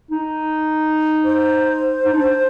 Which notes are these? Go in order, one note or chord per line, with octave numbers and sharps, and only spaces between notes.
D#4
C5
D#4
D4